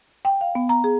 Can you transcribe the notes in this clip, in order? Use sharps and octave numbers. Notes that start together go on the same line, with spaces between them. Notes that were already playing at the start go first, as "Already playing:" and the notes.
G5
F5
B3
A#5
G#4